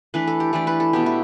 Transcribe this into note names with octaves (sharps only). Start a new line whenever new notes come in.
E3 A3 D4 B4
A4
G4
E3 A3 D4 D5
B4
A4
B2 B3 D4 G4
E4